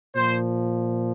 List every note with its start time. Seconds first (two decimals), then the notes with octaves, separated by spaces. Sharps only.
0.16 A#2 F3 C5